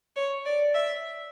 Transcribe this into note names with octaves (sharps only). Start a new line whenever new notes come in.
C#5
D5
E5